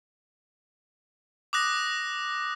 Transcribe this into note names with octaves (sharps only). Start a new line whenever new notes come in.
D6 D#6 F#6 A#6